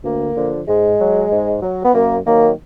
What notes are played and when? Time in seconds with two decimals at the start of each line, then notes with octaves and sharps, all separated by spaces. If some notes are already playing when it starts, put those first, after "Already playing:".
0.04 D2 A#3
0.36 D3 F3
0.67 G#2 G#3
0.99 F#3
1.31 G#2
1.62 F#3
1.84 B3
1.94 F#2 A#3
2.25 D#3 F#3 A#3